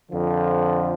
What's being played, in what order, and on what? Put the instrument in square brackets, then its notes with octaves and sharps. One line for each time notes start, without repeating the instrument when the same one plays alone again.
[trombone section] F2 D3 F3